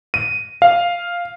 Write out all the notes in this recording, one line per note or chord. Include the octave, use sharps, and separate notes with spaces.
D#7
F5